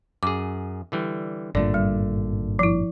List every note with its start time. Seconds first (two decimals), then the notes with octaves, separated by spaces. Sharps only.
0.23 F#2 G#4 D6
0.92 D3 E3 G3
1.55 G#1 G2 A#2 D3 A3 D5
1.74 G3
2.59 F3 E4